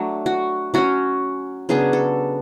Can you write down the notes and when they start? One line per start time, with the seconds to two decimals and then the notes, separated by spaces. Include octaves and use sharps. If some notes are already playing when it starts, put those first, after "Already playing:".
Already playing: F#3 A3 D4
0.26 F#4
0.74 F#3 C#4 F#4
1.69 C#3 F#3 B3 D4 G#4
1.93 A4